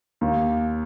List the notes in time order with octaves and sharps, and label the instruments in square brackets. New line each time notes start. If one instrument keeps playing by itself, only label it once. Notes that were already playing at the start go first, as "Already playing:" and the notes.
[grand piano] D#2